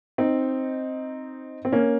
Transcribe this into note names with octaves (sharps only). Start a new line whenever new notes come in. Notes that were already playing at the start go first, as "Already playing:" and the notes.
C4 D#4
C4
A#3 C#4